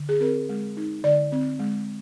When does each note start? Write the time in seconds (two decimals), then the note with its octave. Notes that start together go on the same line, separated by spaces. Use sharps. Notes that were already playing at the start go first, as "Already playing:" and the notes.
Already playing: D3
0.09 G#4
0.20 C4 A#4
0.49 G#3
0.77 D#4
1.04 D3 D5
1.32 C4
1.59 G#3